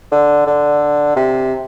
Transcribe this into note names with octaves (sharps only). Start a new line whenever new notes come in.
D3
D3
C3